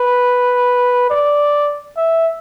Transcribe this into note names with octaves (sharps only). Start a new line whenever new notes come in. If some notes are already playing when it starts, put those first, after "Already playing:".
Already playing: B4
D5
E5